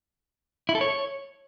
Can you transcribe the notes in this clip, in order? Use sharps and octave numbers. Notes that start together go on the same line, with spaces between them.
E4
A4
C#5